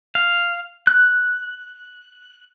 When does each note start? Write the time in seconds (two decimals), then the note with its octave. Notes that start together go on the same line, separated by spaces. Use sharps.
0.15 F5
0.87 F#6